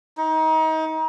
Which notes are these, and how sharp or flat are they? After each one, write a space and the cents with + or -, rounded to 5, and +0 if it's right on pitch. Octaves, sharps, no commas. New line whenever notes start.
D#4 +30